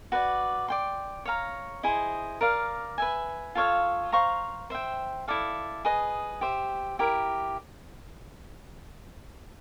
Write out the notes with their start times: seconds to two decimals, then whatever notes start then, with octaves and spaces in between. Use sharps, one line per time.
0.12 F#4 B4 D5
0.68 D5 G5 C6
1.25 C#5 F5 A#5
1.83 E4 G#4 C5 D#5
2.41 A#4 D5 F5
2.98 B4 E5 G#5
3.55 F4 A4 C#5 F5
4.12 C5 F5 A#5 C#6
4.70 C5 E5 G5
5.28 E4 A4 D5 F5
5.85 G#4 B4 D#5
6.41 G4 C5 E5
6.99 E4 G4 A#4